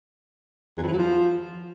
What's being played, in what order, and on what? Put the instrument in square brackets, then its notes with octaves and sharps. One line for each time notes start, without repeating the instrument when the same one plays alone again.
[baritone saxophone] E2
F2
E3
F#3
F3